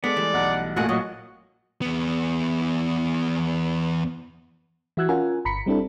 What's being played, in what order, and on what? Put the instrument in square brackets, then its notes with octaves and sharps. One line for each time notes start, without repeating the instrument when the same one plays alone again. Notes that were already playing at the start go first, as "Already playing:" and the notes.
[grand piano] G#3 A4 [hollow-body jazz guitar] B3 [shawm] D5
[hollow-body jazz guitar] E3 G3 A3
[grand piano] B1 [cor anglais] F#5
[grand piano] A1 A#2 [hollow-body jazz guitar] G#3 F#4 G#4 [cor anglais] A3 [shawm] F#5
[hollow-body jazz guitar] F#3 [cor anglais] F#4 [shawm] D#5
[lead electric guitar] E2 B3
[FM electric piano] E3 E4 F#4 E6 F#6 G#6
C#4 F4 A#4 F#5 G#5
G1 A#5 B5 B6 C#7
G3 C4 D4 E4 A4